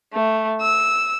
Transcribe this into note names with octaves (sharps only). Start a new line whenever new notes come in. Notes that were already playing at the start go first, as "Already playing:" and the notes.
A3
E6